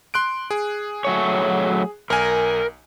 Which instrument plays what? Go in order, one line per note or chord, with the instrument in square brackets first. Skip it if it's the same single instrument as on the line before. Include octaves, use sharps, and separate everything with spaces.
[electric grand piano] C6 F#6 D7
G#4
[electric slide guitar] F#3 A3 C#5
[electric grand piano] B1 G#5 [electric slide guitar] A#4